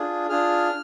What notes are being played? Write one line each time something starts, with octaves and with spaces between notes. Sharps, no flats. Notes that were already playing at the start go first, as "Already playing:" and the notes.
Already playing: D4 F4 G#4
D4 F4 G#4 F6